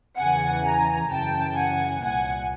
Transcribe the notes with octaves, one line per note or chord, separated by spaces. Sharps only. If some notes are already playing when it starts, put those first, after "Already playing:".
E2 C#3 E3 F#5 G#5
G#5 A#5
F#2 C#3 E3 G5 A5
F#5 G#5
C2 A#2 F#5 G#5